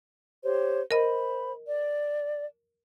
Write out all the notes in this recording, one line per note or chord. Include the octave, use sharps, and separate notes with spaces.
G4 C5 C#5
A#4 C5 D#5 B5
D5